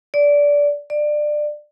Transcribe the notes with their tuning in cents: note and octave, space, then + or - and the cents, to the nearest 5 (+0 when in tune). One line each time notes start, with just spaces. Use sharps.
D5 -15
D5 +20